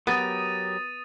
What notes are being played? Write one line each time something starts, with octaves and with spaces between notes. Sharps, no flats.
F#3 B3 G4 A#4 D#6 A6 D#7